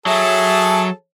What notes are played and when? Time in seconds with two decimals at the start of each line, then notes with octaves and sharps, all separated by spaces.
0.06 F#3 G#4 A4 E5 A5